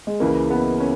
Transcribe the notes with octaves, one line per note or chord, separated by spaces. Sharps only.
G#3
C#2 C#3 E3 A#3
B3
C#4